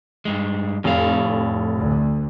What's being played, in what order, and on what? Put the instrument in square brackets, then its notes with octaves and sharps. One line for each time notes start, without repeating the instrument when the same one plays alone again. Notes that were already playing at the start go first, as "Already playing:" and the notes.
[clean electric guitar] G2 G#3
[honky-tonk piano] F1 [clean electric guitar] A2 F5
[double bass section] D2